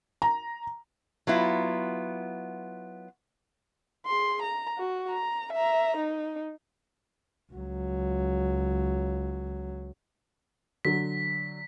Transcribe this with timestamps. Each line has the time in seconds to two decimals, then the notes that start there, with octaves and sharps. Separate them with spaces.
0.22 A#5
1.27 F#3 B3 E4 F4
4.06 G#4 C6
4.42 A#5
4.78 F#4
5.10 A#5
5.53 E5 A#5
5.96 D#4
7.53 C#2 F#3
10.85 D3 F#3 B6